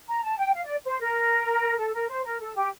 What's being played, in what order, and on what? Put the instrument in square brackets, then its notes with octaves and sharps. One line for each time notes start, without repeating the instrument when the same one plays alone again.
[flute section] A#5
A5
G5
F5
D5
C5
A#4
A4
A#4
C5
A#4
A4
G4